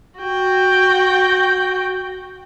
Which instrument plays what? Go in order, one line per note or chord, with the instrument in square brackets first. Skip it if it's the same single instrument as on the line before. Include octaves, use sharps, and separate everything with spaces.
[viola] F#4 G5